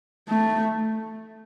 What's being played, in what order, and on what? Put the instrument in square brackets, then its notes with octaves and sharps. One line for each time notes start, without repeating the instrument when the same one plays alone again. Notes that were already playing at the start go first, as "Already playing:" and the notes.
[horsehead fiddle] A3